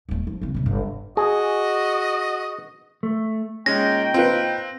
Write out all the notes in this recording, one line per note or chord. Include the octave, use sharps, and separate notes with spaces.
D#1 A3
F3
C#3 C4
A#1 C3
G1
F#4 G#4 D#5
A3
A#2 G#3 C#4 D#4 G5 A#6
C4 F4 B4